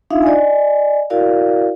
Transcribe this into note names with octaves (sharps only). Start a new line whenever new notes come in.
D4 D#4 F4 E5 F5
D5 D#5 G#5
E4 F#4 A#4 D5 F5